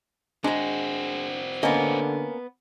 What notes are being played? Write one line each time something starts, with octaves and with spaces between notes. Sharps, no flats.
G#3 C4 D4 F#4 A#5
D3 A#3 B3 C#4 D#5